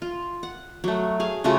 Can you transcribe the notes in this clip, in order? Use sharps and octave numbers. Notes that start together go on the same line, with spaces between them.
F4
F#5
F#3 A3
G#4 F5
C#3 A3 F4 F#4